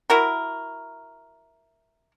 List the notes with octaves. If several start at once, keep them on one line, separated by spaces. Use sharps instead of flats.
E4 F#4 A#4